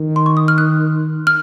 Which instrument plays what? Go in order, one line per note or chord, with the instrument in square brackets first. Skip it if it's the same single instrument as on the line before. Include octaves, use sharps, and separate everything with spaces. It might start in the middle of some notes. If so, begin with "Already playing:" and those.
Already playing: [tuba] D#3
[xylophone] C6
C#6
D#6
F6
F#6
F6